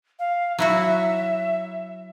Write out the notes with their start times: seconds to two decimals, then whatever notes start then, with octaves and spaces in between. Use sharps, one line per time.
0.19 F5
0.59 F#3 E4 F#4 E5